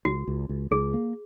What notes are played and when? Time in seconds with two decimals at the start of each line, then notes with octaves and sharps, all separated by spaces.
0.05 C#2 F#4
0.28 C#2
0.49 C#2
0.71 C#2 G#4
0.94 A#3